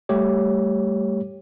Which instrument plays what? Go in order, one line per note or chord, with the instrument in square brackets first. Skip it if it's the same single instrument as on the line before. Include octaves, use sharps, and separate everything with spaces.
[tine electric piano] G3 A3 G4 C#5